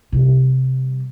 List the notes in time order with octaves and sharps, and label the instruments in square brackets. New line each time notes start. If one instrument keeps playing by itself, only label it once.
[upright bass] C3 G3